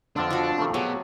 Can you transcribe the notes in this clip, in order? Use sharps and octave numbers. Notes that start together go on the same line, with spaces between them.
F2 D3 B3 C4 D4 F4
F3 F#4
B2 D#3 A3 G4
B2 F#3 G#4